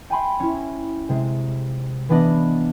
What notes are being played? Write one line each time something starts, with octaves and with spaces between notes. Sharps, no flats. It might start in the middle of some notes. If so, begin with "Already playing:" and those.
G5 G#5 B5 C6
C#4 E4
C3 G#3
E3 B3 D4 D#5